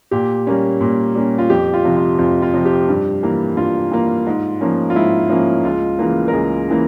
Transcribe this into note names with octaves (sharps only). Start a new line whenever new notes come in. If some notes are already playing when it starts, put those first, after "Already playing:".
A#2 G4
G3 A#3 C#4
A#2
G3 A#3 C#4
F4
F2 G4
F4
C3 F3
F4
F2 F4
F4
C3 F3
G4
G2
E3 A#3
G2 F4
E3 A#3
G#2
F3 A#3 C#4
F4
G#2 E4
F3 A#3 C#4
C#2 F4
C#3 E3 A#3
A#4
C#2 G#4
C#3 E3 A#3